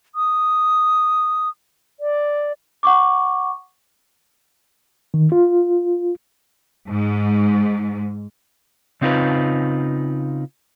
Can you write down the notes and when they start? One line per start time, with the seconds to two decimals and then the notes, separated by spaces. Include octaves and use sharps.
0.15 D#6
2.00 D5
2.83 F#5 C#6 D6
5.14 D#3
5.32 F4
6.88 G#2
9.01 C#3 C4 D#4 F4 B4